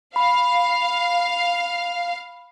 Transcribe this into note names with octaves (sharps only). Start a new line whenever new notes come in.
F5 B5